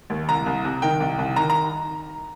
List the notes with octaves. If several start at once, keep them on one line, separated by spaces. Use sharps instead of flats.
D#2
C2 A#5
C2
C3
D#3 G5
C2
C2
D#3 A#5
A#5